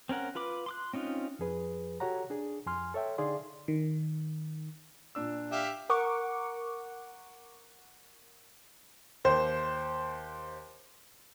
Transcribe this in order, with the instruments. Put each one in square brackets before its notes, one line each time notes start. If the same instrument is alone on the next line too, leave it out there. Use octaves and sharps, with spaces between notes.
[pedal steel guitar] C4 C#4 A#4 F#5
F4 B4 B5 D6
C6 D6 F#6
C4 C#4 D#4 F4
[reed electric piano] F2 F3 G#4 B4
F#4 G4 A4 C#5 F#5 A#5
D4 G#4
F2 G#5 C6 F6
A4 C#5 E5 G5
D3 D#4 G#4 D5 F5 C6
[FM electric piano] D#3
[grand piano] A#2 D4 E6
[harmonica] G4 E5 F5
[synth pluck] A#4 F#5 C#6 D6
[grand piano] D#2 C5